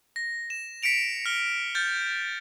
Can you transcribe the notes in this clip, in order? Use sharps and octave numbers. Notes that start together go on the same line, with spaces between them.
A#6
E7
B6 C#7 D7 F7
F6 C#7 G7
F6 G6 A6